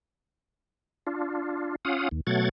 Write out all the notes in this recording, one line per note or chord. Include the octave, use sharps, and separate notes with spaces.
D4 F4
C#4 F4 F5 F#5 D#6
D#2
B2 F#3 A3 F#5 G#6 A6